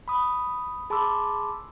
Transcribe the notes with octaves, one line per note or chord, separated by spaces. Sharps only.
B5 D#6
G#4 A5 B5 C6 D6 E6